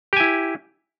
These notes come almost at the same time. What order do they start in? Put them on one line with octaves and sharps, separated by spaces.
G4 G#5 E4